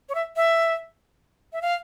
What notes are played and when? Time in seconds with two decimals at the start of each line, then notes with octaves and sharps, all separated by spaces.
0.09 C#5
0.15 E5
0.36 E5
1.53 E5
1.62 F5